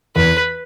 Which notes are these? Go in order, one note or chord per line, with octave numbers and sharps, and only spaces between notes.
E2 B4